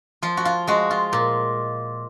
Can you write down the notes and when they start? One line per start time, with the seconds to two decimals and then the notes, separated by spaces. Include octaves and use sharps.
0.22 F3 F4
0.37 F#4
0.45 F4
0.67 G#3 F#4
0.91 F4
1.13 A#2